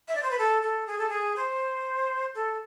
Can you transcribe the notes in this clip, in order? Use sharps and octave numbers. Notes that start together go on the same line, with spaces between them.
E5
D5
C5
B4
A4
A4
G#4
A4
G#4
C5
A4